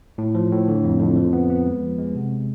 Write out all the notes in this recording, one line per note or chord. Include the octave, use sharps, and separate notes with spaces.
A2
F3
A2
D3
F2
F2
F3
B3
B3
G#3
F3
G#3
C3